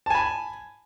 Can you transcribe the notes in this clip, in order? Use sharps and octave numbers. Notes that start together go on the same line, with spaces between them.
G#5 A5 B5